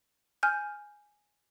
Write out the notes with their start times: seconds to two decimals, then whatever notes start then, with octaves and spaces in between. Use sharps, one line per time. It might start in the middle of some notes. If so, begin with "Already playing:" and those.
0.43 G#5 F6 G6